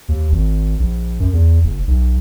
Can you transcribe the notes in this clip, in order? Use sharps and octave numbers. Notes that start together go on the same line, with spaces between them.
D#2
G#1
A#1
F#2
E2
F#1
B1